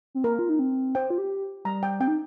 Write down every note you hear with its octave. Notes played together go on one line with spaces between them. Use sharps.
C4
A#3 A#4
F4
D#4
C4
C5 G5
F4
G4
G3 A#5
G5
C4 G5
D#4